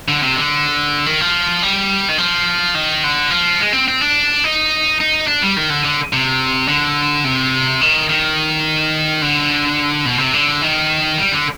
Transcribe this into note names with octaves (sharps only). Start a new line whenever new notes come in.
D3
C3
D3
D#3
F3
G3
D#3
F3
D#3
D3
F3
G#3
C4
C4
D4
D#4
D#4
D4
G3
D#3
D3
D3
C3
D3
C3
D#3
D#3
D3
B2
C3
D3
D#3
G3
D3